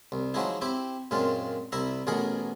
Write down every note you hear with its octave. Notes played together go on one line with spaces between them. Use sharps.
C2
F3 F#3 G#3 D#4 E4
C4 E4 G4
F#2 A#2 G#3 C4 F4
C2 E4 E5 A#5
A1 B2 G#4 A#4 F#5